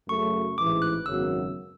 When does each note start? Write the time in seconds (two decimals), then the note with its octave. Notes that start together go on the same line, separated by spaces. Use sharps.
0.09 F#2 C#3 F#3 A3 C#6
0.58 A1 G#2 E3 D6
0.82 F#6
1.06 G#1 F#2 C#3 F#3 B3 E6